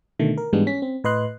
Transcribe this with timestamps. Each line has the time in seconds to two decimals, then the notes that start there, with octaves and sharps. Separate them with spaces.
0.19 B2 D3 D#3 A3
0.38 A#4
0.53 G#2 E3 G3 G#3 B3 D4
0.67 C#4 B6
0.82 C4
1.04 A2 B4 D#5 C6 F#6